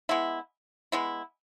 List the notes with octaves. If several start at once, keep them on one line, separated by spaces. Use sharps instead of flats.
G#3 B3 E4
G#3 B3 E4